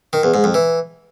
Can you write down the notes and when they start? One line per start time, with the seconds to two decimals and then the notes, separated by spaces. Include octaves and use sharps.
0.13 D#3
0.23 E2
0.34 G#2
0.44 F2
0.54 E3